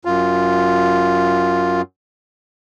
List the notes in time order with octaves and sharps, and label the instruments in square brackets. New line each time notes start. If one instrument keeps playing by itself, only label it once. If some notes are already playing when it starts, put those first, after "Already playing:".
[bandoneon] F#2 F4